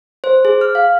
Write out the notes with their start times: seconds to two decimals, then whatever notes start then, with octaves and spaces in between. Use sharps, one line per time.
0.24 C5
0.45 G#4
0.61 F6
0.75 F5